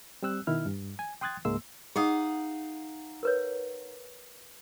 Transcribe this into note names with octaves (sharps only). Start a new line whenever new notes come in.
G3 C4 E6 F#6
B2 D#3 E4 F6
G2
G#5
G5 C6 D#6 F#6 G#6 A6
C#2 G#2 G#3 A#3 C6 E6
D#4 G#4 D#5 F5 F#5 D#6
A#4 B4 C#5